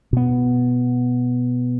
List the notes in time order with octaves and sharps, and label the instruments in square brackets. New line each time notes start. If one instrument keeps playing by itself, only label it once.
[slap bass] B2 B3